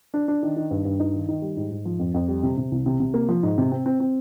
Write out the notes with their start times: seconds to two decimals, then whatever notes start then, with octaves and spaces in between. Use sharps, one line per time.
0.14 D4
0.28 D4
0.43 D#3
0.57 D#3
0.71 G2
0.85 G2
1.00 D#4
1.14 D#3
1.29 D#3
1.42 G3
1.57 G#2
1.71 G#2
1.85 F3
1.99 F2
2.14 F2
2.28 G3
2.43 C3
2.57 C3
2.72 C2
2.86 C3
3.00 C3
3.14 A#3
3.29 F3
3.43 G#2
3.58 C3
3.72 C4
3.86 C4
4.00 C4